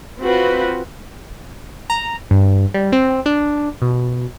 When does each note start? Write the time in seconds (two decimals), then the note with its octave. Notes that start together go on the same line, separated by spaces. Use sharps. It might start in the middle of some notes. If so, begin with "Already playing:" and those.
0.21 C4 F4 F#4 B4
1.90 A#5
2.31 G2
2.74 G3
2.92 C4
3.26 D4
3.82 B2